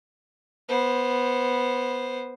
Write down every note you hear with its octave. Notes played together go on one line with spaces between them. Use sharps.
B3 C5